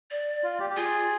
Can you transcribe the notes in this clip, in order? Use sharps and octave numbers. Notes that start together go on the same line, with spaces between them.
D5
F4
G4
G4
F4 G#4